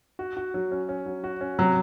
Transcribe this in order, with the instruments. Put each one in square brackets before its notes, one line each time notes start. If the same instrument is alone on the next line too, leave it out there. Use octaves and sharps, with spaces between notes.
[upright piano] F#4
F#4
F#3
C#4
C#4
F#3
F#4
C#4
[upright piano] C3 [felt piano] F#3